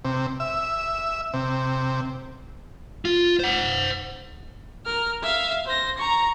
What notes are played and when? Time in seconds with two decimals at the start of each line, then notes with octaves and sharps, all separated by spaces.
0.05 C3
0.40 E5
1.34 C3
3.05 F4
3.39 C5 F#5
4.86 A#4 F6
5.23 E5 F5
5.66 C5 A#6
5.98 A#5 C#6